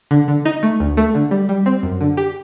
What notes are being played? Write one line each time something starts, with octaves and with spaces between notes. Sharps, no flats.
D3
D3
D#4
A3
D2
A3
D3
G3
G3
C4
F#2
D3
G4